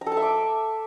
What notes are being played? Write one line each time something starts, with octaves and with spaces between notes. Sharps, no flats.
A#5
A4
A5
E5
D6